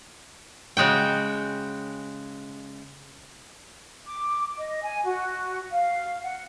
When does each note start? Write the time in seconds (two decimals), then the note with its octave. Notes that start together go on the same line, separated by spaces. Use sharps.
0.77 C#3 G#3 F#4 G5
4.05 D6
4.57 D#5
4.82 G#5
5.04 F#4
5.72 F5
6.22 F#5